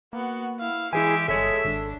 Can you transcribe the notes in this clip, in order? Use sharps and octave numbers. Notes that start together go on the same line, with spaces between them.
A#3 B3 F#4
E4 F5
E3 G#3 E4 G4 G#4 E5 G#5
G1 G#3 G#4 A4 C#5 E5
G#1 D4